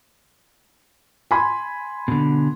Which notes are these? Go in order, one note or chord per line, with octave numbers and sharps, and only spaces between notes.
G#5 B5 C6
B2 D3